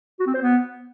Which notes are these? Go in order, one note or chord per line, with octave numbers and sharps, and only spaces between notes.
F#4
C4
C5
B3